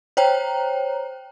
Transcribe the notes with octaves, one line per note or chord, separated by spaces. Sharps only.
C5 C#5 G5 A#5